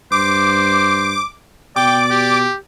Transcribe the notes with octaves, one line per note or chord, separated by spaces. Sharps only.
G2 C5 D6
B2 D5 G5 D6
G4